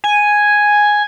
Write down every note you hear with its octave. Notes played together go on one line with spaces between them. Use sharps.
G#5